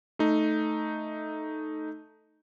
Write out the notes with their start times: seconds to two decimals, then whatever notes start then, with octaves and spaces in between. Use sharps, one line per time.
0.19 A3 D#4